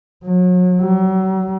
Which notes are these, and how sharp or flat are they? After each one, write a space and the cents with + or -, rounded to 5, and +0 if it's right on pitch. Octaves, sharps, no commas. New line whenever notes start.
F#3 -35
F#3 +40